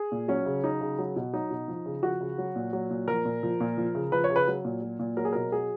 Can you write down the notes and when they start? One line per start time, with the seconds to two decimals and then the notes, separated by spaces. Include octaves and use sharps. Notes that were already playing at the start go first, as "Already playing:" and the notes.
Already playing: G#4
0.12 A#2
0.28 F#3 C#4
0.46 C#3
0.64 F#3 D#4
0.81 C#3
0.99 F#3
1.16 B2
1.33 F#3 D#4
1.51 B2
1.68 F3
1.86 C#3
2.03 F3 F#4
2.21 C#3
2.38 F#3
2.56 A#2
2.73 F#3
2.90 A#2
3.08 F3 A#4
3.25 A#2
3.43 F3
3.60 A#2
3.77 F3
3.95 C#3
4.12 F3 B4
4.24 C#5
4.30 C#3
4.36 B4
4.47 F#3
4.65 A#2
4.82 F#3
4.99 A#2
5.17 F#3 A#4
5.25 G#4
5.33 B2 A#4
5.52 F#3 G#4